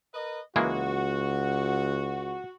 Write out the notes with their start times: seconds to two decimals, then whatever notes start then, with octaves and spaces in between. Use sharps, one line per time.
0.14 A#4 B4 D#5
0.56 C#2 E3 G#3 A#3 F#4